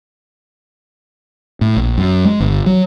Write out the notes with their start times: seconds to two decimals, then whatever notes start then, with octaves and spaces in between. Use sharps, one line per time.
1.61 A2
1.77 A#1
1.98 F#2
2.25 G#3
2.40 G1
2.66 F#3